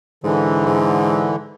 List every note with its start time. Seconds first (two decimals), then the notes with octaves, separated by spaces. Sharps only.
0.24 G#2 D3 E3
0.66 G#2